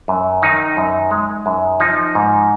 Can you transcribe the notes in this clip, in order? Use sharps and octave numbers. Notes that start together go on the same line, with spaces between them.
F#2
D#3 D#4
F#2
G#3
F#2
F3 D#4
G#2